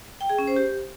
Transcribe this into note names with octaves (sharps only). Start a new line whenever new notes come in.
G5
G#4
C#4
C5
G4